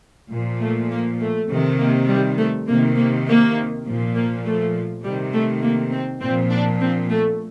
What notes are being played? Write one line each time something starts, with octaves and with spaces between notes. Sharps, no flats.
A#2 F3
A3
A#3
A3
C3 D#3
A#3
G3
A3
C3 D#3 A#3
A#3
A#3
A#2 F3
A#3
A3
C3 D#3 G3
A3
A#3
C4
A#2 F3 C4
D4
C4
A3